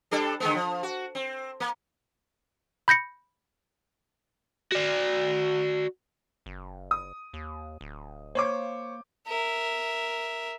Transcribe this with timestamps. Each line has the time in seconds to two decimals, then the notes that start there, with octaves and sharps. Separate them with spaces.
0.11 G3 D4 A4
0.40 D3 G#3 B3
0.55 F3
0.83 F#4
1.15 C4
1.60 A#3
2.88 B5 G6 A#6 C#7
4.72 F#4 D5
6.46 F#1
6.91 D#6
7.33 D#2
7.81 D1
8.35 A#3 C5 C#5 D6
9.28 A#4 E5